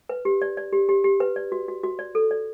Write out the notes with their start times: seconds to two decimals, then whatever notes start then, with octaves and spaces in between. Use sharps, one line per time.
0.09 B4
0.25 G4
0.42 D5
0.57 D5
0.73 G4
0.89 G4
1.04 G4
1.20 B4
1.36 D5
1.52 F#4
1.68 F#4
1.83 F#4
1.99 D5
2.15 A4
2.31 D5